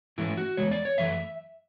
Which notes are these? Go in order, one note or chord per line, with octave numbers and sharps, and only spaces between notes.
G#2 E3 A3 C#4 E4
F#4
E2 B2 G#3 C#5
D5
C#5
F#2 E3 A3 E5